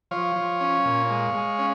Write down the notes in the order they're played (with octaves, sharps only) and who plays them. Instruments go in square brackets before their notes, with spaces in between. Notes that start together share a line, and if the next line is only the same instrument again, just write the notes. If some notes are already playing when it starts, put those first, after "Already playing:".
[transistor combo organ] F3 C#5 F5
F3
C#4
A#2
G#3
G#3
C#4